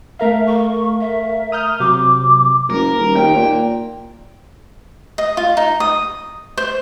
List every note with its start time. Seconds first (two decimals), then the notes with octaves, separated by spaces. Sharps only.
0.19 A3 A#4 E5 F5
0.47 C#6
1.00 E5
1.52 A#5 D#6 F6 G6
1.80 C3 F#3 D6
2.70 F#1 A#4
2.98 D#1
3.16 D#2 G5
3.36 A#2
5.18 D#5
5.37 F4
5.57 D#4
5.80 D#6
6.57 C5